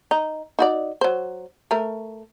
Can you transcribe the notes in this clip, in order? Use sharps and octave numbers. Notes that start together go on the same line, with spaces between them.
D#4
D#4 F#4 D5
F#3 C5
A3 A#4